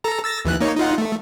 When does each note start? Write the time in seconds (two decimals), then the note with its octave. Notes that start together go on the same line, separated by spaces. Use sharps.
0.04 A4 A#5
0.24 E6 A6 A#6
0.45 D#2 E3 F#6
0.61 A#3 D#4 C#5
0.77 D#4 F4 F#5
0.98 A3